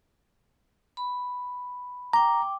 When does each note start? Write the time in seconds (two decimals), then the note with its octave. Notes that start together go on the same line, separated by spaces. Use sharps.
0.97 B5
2.13 G5 A#5 D6